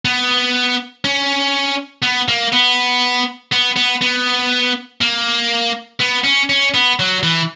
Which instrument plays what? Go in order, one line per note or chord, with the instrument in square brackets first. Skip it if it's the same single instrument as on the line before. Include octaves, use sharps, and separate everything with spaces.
[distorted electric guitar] B3
C#4
B3
A#3
B3
B3
B3
B3
A#3
B3
C#4
C#4
B3
F#3
E3